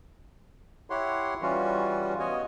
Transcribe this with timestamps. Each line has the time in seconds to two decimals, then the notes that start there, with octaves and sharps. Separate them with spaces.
0.90 E4 G4 C#5 F#5 C6
1.42 E3 G3 C#4 F4 F#4
2.19 B3 F#4 C#5 D#5 G#5